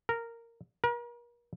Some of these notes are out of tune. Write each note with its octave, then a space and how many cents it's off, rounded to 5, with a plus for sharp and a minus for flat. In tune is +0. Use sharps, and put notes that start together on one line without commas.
A#4 -10
A#4 +40